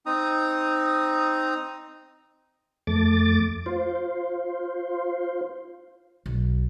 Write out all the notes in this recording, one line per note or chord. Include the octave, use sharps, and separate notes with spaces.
C4 D#4 A#5 D#6
F2 A3 D6 A6
F4 C5
B1